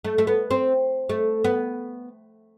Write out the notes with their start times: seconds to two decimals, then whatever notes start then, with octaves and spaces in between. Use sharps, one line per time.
0.04 A3
0.18 A3
0.27 B3
0.51 C4
1.09 A3
1.44 B3